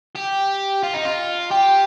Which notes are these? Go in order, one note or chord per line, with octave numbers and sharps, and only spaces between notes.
G4
F4
D#4
F4
G4